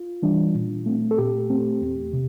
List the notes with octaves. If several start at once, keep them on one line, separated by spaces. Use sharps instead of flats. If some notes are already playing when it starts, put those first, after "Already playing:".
Already playing: F4
E3 G3 D4
A#2
A3 C4
A4
A#2 G4
A3 C4
E2
C3